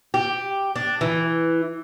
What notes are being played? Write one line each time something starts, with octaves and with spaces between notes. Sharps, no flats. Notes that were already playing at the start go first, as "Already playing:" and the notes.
G4
D4
E3